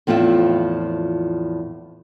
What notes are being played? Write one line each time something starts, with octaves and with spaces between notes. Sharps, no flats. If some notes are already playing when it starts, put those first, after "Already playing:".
E2 A2 F3 C4 F4 E5